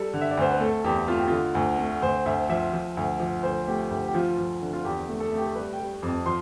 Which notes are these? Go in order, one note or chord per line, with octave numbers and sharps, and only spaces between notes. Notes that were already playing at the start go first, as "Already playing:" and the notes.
Already playing: G3 A4
D3
E5
D5
D2 C5
B4
A3 A4
E2 G4
A3 F4
G4
D3 F4
D2
A3
D2 C5
D2 E5
F3 E5
F3
D2
F3
D2 C5
A3 G4
D2 G4
G4
F3 F4
F3
D3
F4
E2 G4
A3
A4
A3
G4
A4
G3 B4
G5
G3
F2
A5
F3 C6